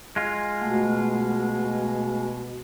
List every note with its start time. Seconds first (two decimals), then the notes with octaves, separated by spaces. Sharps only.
0.16 G#3 F4
0.61 B2 A3 F#5